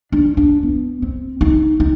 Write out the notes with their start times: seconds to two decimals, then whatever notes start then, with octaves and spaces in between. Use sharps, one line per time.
0.12 D4
0.37 D4
0.63 B3
1.02 C4
1.41 D#4
1.80 D#4